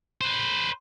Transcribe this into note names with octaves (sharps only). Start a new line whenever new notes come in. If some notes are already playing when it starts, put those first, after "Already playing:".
B4 C5